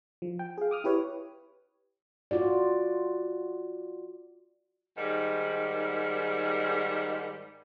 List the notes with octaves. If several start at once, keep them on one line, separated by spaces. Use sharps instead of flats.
F3
G5
G#4 F5
D6 D#6 F6
E4 G4 B4 C#5
F4 F#4 D5
G#2 D#3 G3